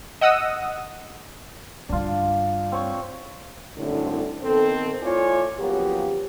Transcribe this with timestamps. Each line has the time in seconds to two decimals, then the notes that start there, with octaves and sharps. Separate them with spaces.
0.21 D#5 F#5 D#6 E6
1.89 G2 D3 D4 F4
2.72 C4 C#5
3.77 C2 F#2 A2 D3
4.44 D#3 B3 C4 A4
5.02 A3 E4 F4 C#5 D5 G#5
5.59 C#3 F3 F#3 A#3 B3 G4